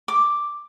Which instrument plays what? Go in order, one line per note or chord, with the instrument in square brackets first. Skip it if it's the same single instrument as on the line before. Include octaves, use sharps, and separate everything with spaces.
[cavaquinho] D6